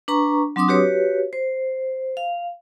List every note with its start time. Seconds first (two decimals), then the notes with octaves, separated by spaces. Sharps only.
0.08 D4 B4 A#5 C#6
0.56 F#3 C4 D4 C6 D6 D#6
0.68 F#4 G4 B4 C#5
1.33 C5
2.17 F5